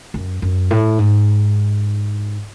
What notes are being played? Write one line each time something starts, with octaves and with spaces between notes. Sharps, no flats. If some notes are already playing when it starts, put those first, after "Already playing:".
F#2
F#2
A2
G#2